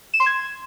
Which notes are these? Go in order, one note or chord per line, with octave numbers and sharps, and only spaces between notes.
E7
C6
G#6